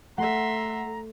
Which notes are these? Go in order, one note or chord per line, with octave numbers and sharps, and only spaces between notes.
A3 E5 F#5 A#5 C6